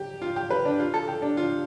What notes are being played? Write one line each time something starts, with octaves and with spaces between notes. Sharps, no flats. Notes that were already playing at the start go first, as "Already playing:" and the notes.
Already playing: G4
F4
G4
B4
D4
F4
A4
G4
D4
F4